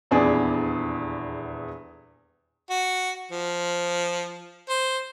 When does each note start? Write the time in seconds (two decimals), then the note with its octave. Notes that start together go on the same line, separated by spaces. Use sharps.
0.11 D#1 E2 B3 D4 G#4
2.70 F#4
3.32 F3
4.69 C5